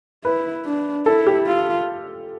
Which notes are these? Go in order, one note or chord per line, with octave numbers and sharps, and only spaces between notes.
E4 B4
D4
E4 A4
G4
F4